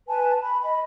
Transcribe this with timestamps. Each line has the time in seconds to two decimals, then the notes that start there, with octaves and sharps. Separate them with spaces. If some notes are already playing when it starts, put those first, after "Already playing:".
0.08 B4 G#5 A5
0.42 B5
0.62 D#5 B5